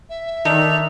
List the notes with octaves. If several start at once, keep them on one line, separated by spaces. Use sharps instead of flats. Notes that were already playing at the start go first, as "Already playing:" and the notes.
E5
D#3 D4 D#4 A4 F7